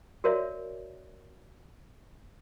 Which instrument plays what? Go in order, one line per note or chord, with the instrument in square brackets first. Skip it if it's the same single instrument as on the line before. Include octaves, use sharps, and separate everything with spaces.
[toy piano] F#4 A#4 C#5 D5 E5